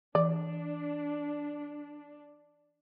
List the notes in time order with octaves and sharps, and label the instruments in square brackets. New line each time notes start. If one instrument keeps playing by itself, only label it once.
[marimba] E3 [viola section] D4 [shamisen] D5